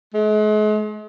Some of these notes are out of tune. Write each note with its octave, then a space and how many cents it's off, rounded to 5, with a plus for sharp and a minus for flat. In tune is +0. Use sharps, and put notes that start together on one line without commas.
G#3 +40